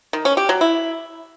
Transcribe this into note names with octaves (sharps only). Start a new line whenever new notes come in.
D#3
C#4
G4
F#3
E4